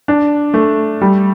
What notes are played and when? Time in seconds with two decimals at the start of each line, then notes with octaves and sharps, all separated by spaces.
0.08 D4
0.54 A3
1.01 G3